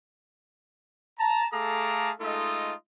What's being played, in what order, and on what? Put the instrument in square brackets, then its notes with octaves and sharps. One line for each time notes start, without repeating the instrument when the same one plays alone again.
[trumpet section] A5 A#5
A3 G#4 A4 F5 A#5 D6
G#3 A3 D#4 F4 A4 D#5